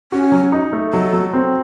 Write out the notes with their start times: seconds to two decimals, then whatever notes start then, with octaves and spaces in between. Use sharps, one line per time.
0.12 C#4 F#4
0.32 F#3
0.52 D#4
0.73 A3
0.93 F#3 A4
1.13 F#3
1.33 C4